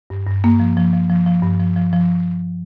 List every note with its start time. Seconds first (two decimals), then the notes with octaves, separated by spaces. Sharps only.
0.10 G2
0.27 G2
0.44 G2 A#3
0.60 F3
0.77 F3
0.93 F3
1.09 F3
1.26 F3
1.43 G2
1.60 F3
1.76 F3
1.93 F3